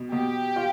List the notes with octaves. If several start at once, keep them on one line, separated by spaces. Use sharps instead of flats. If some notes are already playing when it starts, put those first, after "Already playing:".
Already playing: B2
B2 G4
F4